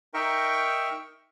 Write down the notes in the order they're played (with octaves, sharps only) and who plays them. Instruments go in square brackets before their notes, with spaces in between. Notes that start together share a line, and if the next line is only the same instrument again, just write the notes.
[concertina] D#4 A#4 E5 G5 C#6